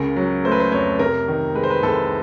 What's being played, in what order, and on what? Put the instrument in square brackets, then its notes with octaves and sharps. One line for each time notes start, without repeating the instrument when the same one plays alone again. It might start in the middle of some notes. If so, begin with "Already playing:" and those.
Already playing: [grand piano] C#2 C#3 A#4
F#3
A3 C5
B4
C5
F2 C#5
C3 A#4
D#3
G#3 B4
C5
B4
C2 A4